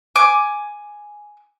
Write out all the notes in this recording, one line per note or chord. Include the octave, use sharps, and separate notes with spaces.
G#5 D6